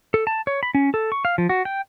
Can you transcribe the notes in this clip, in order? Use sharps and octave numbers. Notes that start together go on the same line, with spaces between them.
A4
A5
C#5
B5
C#4
A4
C#6
F5
F3
F#4
G5